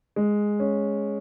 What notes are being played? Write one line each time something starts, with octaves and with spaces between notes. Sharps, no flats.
G#3
C#4